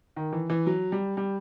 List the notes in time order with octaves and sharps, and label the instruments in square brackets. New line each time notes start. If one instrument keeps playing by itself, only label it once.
[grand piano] D#3
E3
E3
F#3
G3
G3